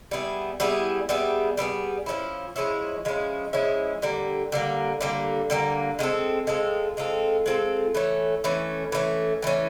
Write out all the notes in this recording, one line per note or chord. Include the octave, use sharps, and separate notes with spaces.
G3 B3 E4 G#4
G3 B3 E4 G#4
G3 B3 E4 G#4
G3 B3 E4 G#4
F3 G#3 C#4 E4
F3 G#3 C#4 E4
F3 G#3 C#4 E4
F3 G#3 C#4 E4
D3 G3 A#3
D3 G3 A#3
D3 G3 A#3
D3 G3 A#3
G#3 C4 F4 A4
G#3 C4 F4 A4
G#3 C4 F4 A4
G#3 C4 F4 A4
E3 A3 C#4
E3 A3 C#4
E3 A3 C#4
E3 A3 C#4